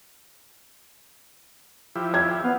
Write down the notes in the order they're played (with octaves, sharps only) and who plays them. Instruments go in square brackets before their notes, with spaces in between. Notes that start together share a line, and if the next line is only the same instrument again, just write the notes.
[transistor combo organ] F3 E4 G4
[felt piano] G#6
[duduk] B3 [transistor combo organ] F5